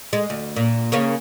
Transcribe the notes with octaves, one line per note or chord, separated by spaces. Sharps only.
G#3
D2
A#2
C#3 A#3 C#4